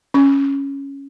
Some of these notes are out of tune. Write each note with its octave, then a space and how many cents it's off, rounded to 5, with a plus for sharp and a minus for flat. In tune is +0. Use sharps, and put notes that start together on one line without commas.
C#4 +0 C#6 +30